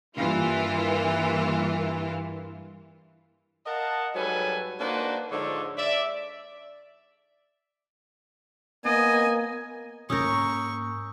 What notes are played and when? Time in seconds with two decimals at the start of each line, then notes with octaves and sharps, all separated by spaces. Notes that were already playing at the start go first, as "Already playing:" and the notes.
0.16 G2 E3 A#3 F4
3.66 A#4 D#5 F5 F#5 A5
4.15 G#2 F#3 G3 A4 B4 G#5
4.80 A#3 D4 D#4 F#4 B4 C5
5.31 G#2 D3 F3 D4 A4 C#5
5.78 D5 E5
8.85 A#3 B3 D#5 G#5
10.10 G#2 A#3 C#4 A#4 C#6 D#6 E6 G6